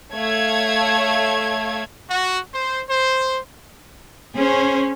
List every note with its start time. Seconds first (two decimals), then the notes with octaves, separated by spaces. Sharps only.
0.14 A3 C#5 F5 G#6
2.11 F#4
2.54 C5
2.89 C5
4.35 C#4 G#4 C5